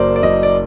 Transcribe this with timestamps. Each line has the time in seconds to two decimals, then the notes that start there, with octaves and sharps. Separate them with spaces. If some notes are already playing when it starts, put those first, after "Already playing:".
Already playing: F#1 F#2 A#4 C5 D5
0.16 D5
0.23 F#1 D#5
0.43 D5